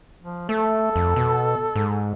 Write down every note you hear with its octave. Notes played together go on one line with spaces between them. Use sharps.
F3
A3 A4
F2
B2
G#2